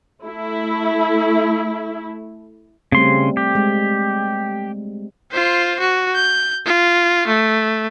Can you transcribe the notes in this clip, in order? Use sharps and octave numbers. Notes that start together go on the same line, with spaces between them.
A3 E4
C#3 G3 A3 C4 C6
G4
G#3
F4 C5
F#4
G6
F4
A3